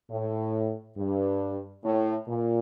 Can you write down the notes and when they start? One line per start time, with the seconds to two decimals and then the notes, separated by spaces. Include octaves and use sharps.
0.11 A2
0.98 G2
1.84 A2
2.29 A#2